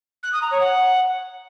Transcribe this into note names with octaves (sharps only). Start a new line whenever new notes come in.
F#6
D#6
A#5
C#5
F#5